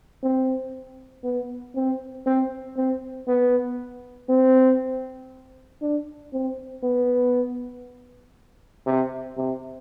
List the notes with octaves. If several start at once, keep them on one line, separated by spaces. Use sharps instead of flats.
C4
B3
C4
C4
C4
B3
C4
D4
C4
B3
C3
C3